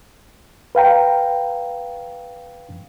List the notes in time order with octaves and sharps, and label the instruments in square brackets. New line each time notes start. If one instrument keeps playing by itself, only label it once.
[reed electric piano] B4 F5 G5 A#5